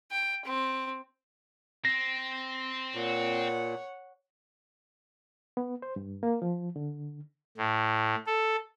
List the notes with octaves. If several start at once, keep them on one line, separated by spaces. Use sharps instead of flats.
G5
C4
C4 A#6
A#2 C#5 F#5
B3
C5
G2
A#3
F3
D3
A2
A4